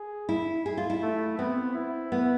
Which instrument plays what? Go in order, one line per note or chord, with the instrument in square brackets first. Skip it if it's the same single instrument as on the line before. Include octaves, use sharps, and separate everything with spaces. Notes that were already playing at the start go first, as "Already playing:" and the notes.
Already playing: [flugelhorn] G#4
[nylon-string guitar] E4
G#4
F4
E4
[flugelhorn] A3
[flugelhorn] B3 [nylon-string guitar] C4
[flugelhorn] E4
[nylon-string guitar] B3